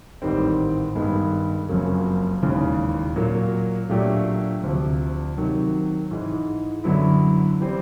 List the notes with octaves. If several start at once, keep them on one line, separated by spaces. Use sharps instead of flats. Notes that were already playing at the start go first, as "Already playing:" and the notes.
A1 G#2 D#3 G3 C4
G2 D#3 G#3 B3
F#1 F2 C#3 F#3 A#3
E1 D#2 C#3 E3
A#2 F#3 A#3
A#2 F#3 A3 D4 G4
D2 C3 F3
C3 D#3 F#3
G#2 E3 G#3
F#2 D3 F#3 B3 E4
E3 G3 C4